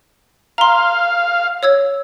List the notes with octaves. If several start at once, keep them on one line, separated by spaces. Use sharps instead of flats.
F5 A#5 C6
C#5 E6 G#6